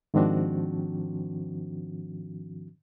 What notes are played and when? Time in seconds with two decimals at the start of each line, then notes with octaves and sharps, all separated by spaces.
0.14 G#2 D#3 F3 C4 D4 F#4